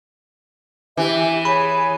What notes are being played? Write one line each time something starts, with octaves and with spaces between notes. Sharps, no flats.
E3 G4 E5
G#4 C#5 G#5 B5